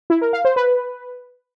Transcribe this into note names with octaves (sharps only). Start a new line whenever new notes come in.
E4
A#4
F5
C5
B4